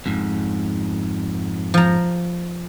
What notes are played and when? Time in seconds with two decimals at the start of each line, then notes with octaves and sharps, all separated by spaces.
0.06 F2 G#2
1.74 F3 A#5